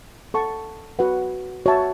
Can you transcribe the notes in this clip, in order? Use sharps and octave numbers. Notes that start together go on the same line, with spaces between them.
A4 F#5 A5 C#6
F#4 B4 F#5
F#4 C#5 E5 A5